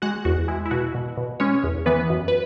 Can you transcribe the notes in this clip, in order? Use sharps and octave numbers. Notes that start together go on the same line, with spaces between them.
G#3 F#4 F#5
E2 F#4
G#3 E4
E4
B2 F#4
B2
B2
G#3 C#4 C#5
E2
E3 B3 B4
F#2
B4